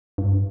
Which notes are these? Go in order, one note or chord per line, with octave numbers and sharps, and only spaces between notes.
G2